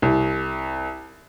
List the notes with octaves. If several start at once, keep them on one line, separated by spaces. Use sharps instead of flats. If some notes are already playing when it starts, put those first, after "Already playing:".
C2